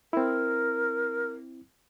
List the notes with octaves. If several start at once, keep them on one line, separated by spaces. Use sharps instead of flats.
C4 E4 A#4